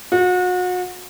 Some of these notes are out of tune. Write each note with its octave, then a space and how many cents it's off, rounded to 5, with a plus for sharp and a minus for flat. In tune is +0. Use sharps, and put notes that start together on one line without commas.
F#4 -35